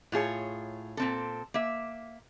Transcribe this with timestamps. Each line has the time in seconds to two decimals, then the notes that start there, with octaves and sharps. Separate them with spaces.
0.12 A2 F4 G#4 C#5
0.97 A#2 C4 A4
1.54 A#3 E5